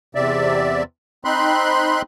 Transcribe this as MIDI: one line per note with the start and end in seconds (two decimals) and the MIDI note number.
0.15 0.83 40
0.15 0.83 48
0.15 0.83 74
0.15 0.83 76
1.25 2.02 60
1.25 2.02 63
1.25 2.02 83
1.25 2.02 84
1.25 2.02 90